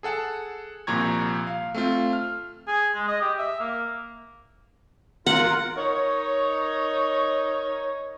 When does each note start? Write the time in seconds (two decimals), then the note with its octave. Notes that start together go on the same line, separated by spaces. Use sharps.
0.03 G#4 A4 F#5 A5
0.87 C2 A#2 F3 A#5 C#6 G#6
1.47 F5
1.75 A3 C4 F4
2.13 F6
2.68 G#4
2.95 G#3
3.08 D#5
3.21 G4
3.38 E5
3.60 A#3
5.26 F4 A#4 F#5
5.76 D#4 A#4 C#5